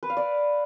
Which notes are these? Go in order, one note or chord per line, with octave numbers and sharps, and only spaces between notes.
B4
F5
D5